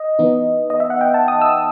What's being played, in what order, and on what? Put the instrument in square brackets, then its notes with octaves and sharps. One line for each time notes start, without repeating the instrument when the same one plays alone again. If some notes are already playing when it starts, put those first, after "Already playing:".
Already playing: [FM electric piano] D#5
E3 B3 D#4
D#5
E5
F#5
G5
A5
D#6
E6